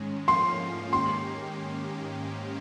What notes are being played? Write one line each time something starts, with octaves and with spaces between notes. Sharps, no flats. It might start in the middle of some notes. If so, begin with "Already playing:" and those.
Already playing: G#2 D#3 G#3 C#4
G#2 F3 A#3 C#4 F4 C6
G#2 D#3 A#3 C#4 G4 C6